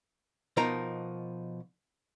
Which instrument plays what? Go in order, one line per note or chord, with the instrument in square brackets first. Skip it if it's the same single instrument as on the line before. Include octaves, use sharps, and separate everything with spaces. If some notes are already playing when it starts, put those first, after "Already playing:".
[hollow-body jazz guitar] B2 F3 D#4 A#4 A#5